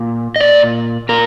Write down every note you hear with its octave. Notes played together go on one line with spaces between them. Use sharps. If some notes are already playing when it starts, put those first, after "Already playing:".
Already playing: A#2
D#5
A#2 D5
A#2 A#4